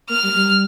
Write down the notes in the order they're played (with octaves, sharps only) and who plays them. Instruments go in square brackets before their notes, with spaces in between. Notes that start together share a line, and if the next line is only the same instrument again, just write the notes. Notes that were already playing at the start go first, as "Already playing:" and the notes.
[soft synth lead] A#3 [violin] F6
[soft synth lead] G3
G3